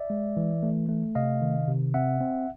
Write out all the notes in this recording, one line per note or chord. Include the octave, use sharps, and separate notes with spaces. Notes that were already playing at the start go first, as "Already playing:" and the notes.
Already playing: D5 E5
G#3
E3
A3
A3
C3 D#5 F5
D#3
C3
C4 E5 F#5
C4